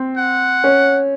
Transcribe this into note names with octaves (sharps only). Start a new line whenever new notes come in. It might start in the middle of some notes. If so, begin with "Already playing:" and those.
Already playing: C4
F#5
C#4